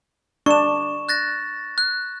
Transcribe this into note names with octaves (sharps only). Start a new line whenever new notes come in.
D4 C#6 E7
F#6 A6 A#6
F#6